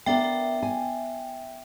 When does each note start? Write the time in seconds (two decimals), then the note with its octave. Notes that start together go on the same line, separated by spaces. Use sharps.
0.06 B3 D4 A#4 E5 G5
0.63 G#5